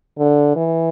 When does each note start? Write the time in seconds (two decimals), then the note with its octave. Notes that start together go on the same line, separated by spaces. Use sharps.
0.18 D3
0.56 E3